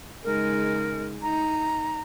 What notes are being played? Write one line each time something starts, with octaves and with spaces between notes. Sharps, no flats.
C#3 G#3 D#4 A#4
D#4 A#5